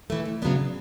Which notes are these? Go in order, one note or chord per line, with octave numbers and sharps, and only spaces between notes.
E3 A3
F2
C#3 F#3 B3 D4